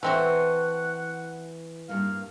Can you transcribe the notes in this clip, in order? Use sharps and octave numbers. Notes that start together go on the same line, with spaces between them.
E3 A3 C4 F#4 F#5
G2 A#3 F5